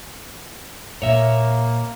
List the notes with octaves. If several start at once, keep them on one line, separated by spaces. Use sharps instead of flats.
A#2 A#3 C#5 E5